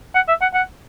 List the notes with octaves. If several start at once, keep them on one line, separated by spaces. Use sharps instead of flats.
F#5
E5
F#5
F#5